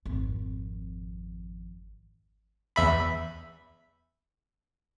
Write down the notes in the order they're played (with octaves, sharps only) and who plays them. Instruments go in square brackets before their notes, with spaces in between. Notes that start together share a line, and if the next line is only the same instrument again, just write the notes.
[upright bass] G#1 F2
[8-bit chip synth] E2 E5 B5